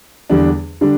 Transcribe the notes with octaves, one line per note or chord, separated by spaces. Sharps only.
E2 D3 G3 D4
D3 G3 D4